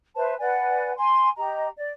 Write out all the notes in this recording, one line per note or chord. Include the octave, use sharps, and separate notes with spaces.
B4 C5 E5 A5
B4 D5 F#5 G#5
G#5 C6
G4 D#5 A#5
D5